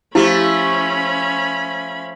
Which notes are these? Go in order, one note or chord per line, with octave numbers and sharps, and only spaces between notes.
F3 A3 C#4 E4 G4 B5